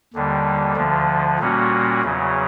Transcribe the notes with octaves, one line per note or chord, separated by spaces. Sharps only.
D#2 D3 G3
D2 D3 F3
A#2 G3 A#3 C#4 F#4
E2 C#3 F#3